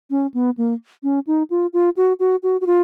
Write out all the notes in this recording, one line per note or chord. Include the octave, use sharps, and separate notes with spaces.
C#4
B3
A#3
C#4
D#4
F4
F4
F#4
F#4
F#4
F#4
F4